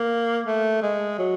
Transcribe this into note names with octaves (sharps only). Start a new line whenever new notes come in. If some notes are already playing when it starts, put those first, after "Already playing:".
Already playing: A#3
A3
G#3
F#3